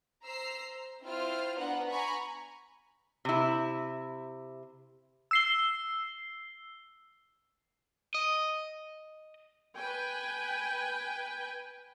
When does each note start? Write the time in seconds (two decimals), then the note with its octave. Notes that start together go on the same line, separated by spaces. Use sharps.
0.25 C5 A#5 E6 C7
0.62 C5
1.04 C4 E4 F4 C5 F6
1.58 B3 D4 F#5 A#5
1.88 G#5 A#5 B5 C#6
3.25 C3 E4
5.31 E6 C7 G7
8.14 D#5
9.78 B4 G5 G#5